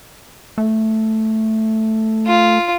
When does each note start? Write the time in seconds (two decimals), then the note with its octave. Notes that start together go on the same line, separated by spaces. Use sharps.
0.58 A3
2.27 F4